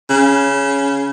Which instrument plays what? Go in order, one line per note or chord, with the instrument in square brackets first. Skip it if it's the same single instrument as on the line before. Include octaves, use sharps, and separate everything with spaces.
[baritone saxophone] C#3